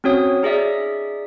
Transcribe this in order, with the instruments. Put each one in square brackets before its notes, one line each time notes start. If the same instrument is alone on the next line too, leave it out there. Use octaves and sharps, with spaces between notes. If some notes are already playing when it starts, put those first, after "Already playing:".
[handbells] C4 C#4 F#4 C#5 D#6
D#4 G#4 D5 E5